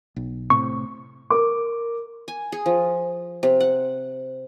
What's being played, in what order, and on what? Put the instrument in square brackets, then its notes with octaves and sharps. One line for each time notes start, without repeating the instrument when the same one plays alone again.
[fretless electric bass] B1
[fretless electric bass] A2 C3 [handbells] C#6
[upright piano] A#4 D6
[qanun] G#5
G#4
F3
C3
F#5